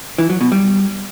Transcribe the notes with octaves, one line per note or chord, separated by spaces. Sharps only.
E3
F#3
B2
G3